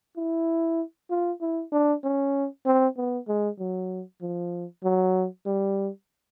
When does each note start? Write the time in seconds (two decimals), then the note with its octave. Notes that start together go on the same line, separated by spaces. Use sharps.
0.17 E4
1.10 F4
1.41 E4
1.73 D4
2.04 C#4
2.66 C4
2.97 B3
3.28 G#3
3.59 F#3
4.22 F3
4.84 F#3
5.46 G3